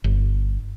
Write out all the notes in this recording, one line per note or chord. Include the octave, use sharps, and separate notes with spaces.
G1